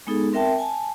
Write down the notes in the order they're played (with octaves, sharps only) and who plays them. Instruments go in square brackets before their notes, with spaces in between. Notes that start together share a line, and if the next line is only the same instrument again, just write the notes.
[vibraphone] G#3 B3 D#4 G#4 A4
C4 A#4 E5 G5 A5
G#5 A5